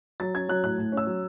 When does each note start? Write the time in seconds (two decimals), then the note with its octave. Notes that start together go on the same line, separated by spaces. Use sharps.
0.20 F#3 A6
0.34 C#4 G#6
0.49 F#3 F#6
0.63 A2 F#6
0.78 A2
0.92 C#4
0.97 E6
1.07 F#3